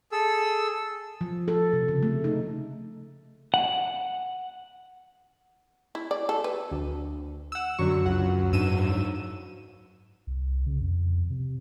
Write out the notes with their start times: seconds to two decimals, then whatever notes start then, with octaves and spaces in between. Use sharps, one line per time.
0.12 G#4 A4 E6
1.21 F3
1.48 A4
1.73 C3
1.88 C#3
2.03 A3
2.24 D#4
3.54 F#5
5.95 E4
6.11 D5
6.29 A4
6.44 B4
6.71 D2
7.52 F#5 E6
7.79 F#2 D3 F#3 C#6
8.06 C#2 F#5
8.53 G#2 D4 E6 D#7 E7
10.27 C2
10.66 C#3
10.81 F2
11.30 C3